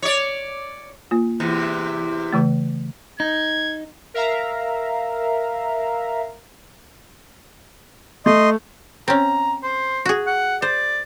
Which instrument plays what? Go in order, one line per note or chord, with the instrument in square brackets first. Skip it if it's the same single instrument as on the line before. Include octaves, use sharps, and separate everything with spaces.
[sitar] C#5 D5
[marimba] A#3 F4
[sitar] E2 C3
[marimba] C#3 E3 A3
[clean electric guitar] D#4 [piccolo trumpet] G#6
[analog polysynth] A#4 E5 F5 A#5
[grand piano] A3 [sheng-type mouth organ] D#5 C6
[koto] C4 C#4 [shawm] A#5
[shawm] C5
[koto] F#4 G#4
[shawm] F#5
[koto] C5 [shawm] D5